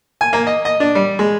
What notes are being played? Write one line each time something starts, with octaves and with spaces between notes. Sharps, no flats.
G#5
A#3
D#5
D#5
D4
G3
G#3